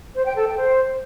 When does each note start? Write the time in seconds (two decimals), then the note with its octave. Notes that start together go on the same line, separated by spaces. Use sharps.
0.15 C5
0.26 G5
0.36 A4
0.47 G5
0.58 C5